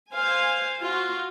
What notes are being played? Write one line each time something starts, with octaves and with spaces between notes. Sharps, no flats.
C5 F5 G#5
F4 F#4